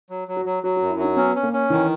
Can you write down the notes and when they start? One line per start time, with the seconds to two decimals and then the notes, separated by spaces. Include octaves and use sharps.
0.10 F#3
0.28 F#3
0.37 F#4
0.45 F#3
0.63 F#3 F#4
0.77 F#4
0.82 F#2
0.90 E4
0.99 F#3 D#4
1.17 B3 C#4
1.35 C#4
1.43 A#3
1.53 C#4
1.70 D#3 E3